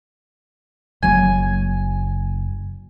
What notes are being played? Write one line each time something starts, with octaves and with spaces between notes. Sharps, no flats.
F#1 F#3 A#3 G#5